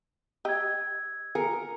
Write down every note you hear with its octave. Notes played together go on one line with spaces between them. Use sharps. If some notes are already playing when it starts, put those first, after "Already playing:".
G4 D#5 E6 G#6
G#4 A#4 C#7